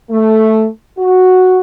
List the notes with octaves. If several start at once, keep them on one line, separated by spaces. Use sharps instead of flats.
A3
F#4